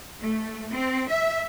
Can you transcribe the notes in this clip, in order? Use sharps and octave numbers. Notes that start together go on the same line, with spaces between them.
A3
C4
E5